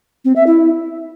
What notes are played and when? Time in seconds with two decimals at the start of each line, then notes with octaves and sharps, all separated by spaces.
0.25 C4
0.36 E5
0.47 E4